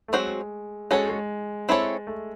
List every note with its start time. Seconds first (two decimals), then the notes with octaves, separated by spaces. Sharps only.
0.08 A3
0.13 F#3 G#3 C4 F#4 C5
0.91 G#3 C#4 F#4 A4 C#5
1.10 G#3
1.69 C4 E4 A4 C#5
2.07 A3